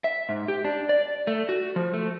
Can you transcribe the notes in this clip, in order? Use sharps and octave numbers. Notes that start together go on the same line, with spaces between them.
E5
G#2
G4
D4
D5
A3
F#4
F3
A3